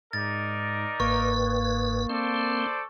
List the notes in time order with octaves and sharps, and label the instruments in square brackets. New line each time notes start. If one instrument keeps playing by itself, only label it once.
[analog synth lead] G#2 [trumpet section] D#4 A#4 D5 [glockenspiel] A6
[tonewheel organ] G1 G#2 B4 [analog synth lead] A#3 [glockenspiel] C#6
[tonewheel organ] C4 [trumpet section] A4 C5 D5